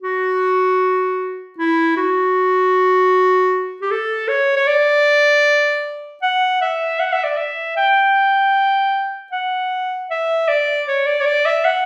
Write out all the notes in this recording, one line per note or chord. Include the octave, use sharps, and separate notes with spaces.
F#4
E4
F#4
G4
A4
C#5
C#5
D5
F#5
E5
F#5
E5
D5
E5
G5
F#5
E5
D5
C#5
D5
C#5
D5
E5
F#5